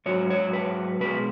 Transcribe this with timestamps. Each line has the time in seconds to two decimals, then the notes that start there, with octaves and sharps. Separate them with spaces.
0.06 G#2 F#3 C#5
0.30 C#5
0.53 B4
1.00 B2 G#3 B4